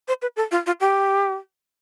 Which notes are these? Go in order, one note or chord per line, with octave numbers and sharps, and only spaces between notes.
C5
B4
A4
F4
F4
G4